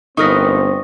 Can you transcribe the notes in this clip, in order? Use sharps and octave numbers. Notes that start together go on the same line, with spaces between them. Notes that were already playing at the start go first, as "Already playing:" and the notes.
G1 C4 D#4 A#4 B4 C#6 D#6 A#6